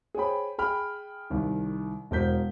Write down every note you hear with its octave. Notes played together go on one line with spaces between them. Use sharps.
G#4 C5 C#5 G5 B5
G#4 G5 B5 F6
C2 D#3
E1 A#4 C5 G6 B6